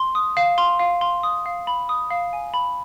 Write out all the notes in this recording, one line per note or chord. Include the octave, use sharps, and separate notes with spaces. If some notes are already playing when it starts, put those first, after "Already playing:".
Already playing: C6
D#6
F5
C6
F5
C6
D#6
F5
B5
D#6
F5
G#5
B5